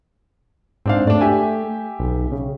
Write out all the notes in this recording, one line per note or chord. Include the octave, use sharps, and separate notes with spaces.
G#2 C4 D4 F5
A3 D4 D5
G4 E5 G#5
B1
C#3